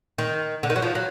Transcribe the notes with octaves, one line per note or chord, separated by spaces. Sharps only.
D#3
D3
D#3
F#3
F3
F#3